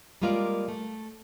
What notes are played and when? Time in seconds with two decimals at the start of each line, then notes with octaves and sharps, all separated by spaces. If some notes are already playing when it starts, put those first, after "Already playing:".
0.22 G3 G#3 A#3 F4 A#4 D5
0.68 A3